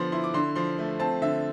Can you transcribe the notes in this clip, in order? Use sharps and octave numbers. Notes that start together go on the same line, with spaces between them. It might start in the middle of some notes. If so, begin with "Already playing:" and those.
Already playing: D3 F3 B3 C6
E4 C6
D6
D3 C6
F3 C6
A3
C4 A5
D3 E5